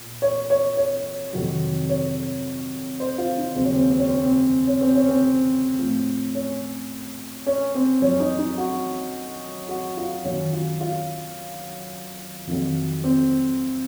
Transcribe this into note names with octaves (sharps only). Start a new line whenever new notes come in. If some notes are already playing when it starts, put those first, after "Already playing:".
Already playing: A#2
C#5
C#5
C#5
F2 C3 D#3 F#3
C#5
C5
F4
D#4
D#2 C#3 F#3 C4
C#4
C4
C#4
C4
C#4
C4
C#4
C4
C#4
C4
C#4
C4
A2 F3
C#4
C#4
C4
F#2 F3 C#4
D#4
D#4
F#4
F#4
F4
F#2 D#3 F#3 C#4
F4
F4
F2 D#3 F#3
C4